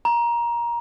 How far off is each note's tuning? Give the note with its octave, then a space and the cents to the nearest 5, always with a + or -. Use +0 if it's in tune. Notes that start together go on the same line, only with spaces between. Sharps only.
A#5 +20